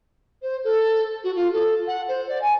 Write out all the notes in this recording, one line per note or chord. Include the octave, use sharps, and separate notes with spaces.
C5
A4
F#4
F4
A4
F#5
C5
D5
G#5